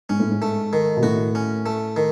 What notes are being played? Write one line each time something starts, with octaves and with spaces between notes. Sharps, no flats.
G#2 C#4
A2
G#2
A3
D#3
B2
A2 F#4
C#4
A3
D#3